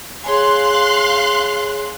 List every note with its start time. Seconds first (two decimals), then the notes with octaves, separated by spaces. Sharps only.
0.24 G#4 C#5 F5 G#5 C6 F#6